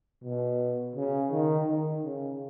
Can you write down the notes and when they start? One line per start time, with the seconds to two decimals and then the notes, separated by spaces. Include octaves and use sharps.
0.24 B2
0.96 C#3
1.31 D#3
1.67 D#3
2.03 C#3